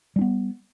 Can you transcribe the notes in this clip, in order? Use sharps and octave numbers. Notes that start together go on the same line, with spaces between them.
G3 B3 D4